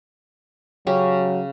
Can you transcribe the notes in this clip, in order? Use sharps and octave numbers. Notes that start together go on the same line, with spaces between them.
C#3 F#3 C#4 G4